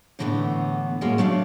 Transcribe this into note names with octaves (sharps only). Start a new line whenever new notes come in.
A2 D3 E3 A3 B3
A2 F#3 G#3 A#3 C#4 G#4
F#3 A3 D4 F5